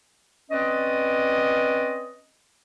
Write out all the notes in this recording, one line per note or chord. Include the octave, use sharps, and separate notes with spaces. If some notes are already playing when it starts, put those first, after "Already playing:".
C4 C#4 B4 D5 D#5